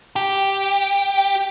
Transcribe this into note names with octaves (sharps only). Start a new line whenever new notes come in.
G4